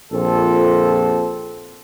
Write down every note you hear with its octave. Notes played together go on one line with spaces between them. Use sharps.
A#1 C4 F4 A4